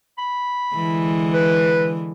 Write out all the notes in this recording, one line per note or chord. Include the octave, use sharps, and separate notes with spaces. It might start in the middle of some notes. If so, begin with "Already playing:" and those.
B5
D3 E3 G#3
B4